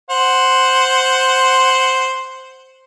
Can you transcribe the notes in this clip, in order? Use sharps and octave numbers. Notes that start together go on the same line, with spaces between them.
C5 F#5